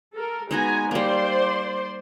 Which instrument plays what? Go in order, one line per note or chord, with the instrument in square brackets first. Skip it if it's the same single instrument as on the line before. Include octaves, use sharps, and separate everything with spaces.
[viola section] A4 A#4
[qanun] G#3 D#4 F#4 [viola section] B3 G#5 A#5
[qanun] G3 A#3 [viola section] C5 D5 C6